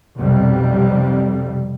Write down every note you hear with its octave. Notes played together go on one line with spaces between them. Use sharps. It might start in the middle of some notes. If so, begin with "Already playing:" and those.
B1 F2 C3 G3